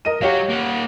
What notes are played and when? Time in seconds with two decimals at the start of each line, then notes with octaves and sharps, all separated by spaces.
0.05 A#4 D#5 D#7
0.22 F#3 F#4 G4 C#5 F5
0.50 A#3 F#5